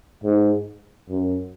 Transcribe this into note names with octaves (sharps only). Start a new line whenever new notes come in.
G#2
F#2